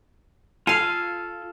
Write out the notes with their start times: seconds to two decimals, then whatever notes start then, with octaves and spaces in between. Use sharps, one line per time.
0.67 F4 A4 F5 G#5